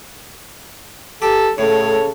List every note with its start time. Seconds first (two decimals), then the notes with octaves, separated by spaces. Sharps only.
1.22 G4 A4
1.58 A2 C#3 A4 C#5